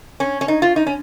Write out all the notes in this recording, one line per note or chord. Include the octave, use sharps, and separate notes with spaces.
C#4
C#4
D#4
F4
D#4
C#4